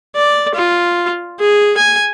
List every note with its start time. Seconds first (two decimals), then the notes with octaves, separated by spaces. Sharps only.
0.16 D5
0.55 F4
1.40 G#4
1.77 G#5